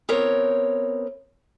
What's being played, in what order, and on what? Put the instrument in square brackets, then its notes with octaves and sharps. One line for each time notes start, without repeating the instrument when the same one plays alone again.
[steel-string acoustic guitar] B3 C4 A#4 C#5